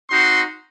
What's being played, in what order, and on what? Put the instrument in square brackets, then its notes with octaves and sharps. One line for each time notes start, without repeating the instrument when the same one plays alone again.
[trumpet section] C4 D#4 F#4 C6